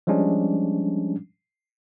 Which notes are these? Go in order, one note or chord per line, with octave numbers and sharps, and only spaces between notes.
F3 G3 G#3 C#4 D4